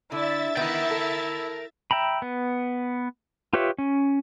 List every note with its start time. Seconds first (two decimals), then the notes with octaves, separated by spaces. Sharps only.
0.12 D3 E4 E5 A6
0.57 D#3 B3 E4 A#4 F#5 G5
0.91 A4
1.91 E5 G5 A#5 B5
2.22 B3
3.53 F4 G4 B4 C#5 E5
3.78 C#4